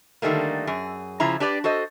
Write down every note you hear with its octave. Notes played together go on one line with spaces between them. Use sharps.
D3 D#3 G3 A3 A#3
F#2 G#4
C#3 F3 E4 A#5
D4 G4 B4 D5
F#4 A4 C5 D#5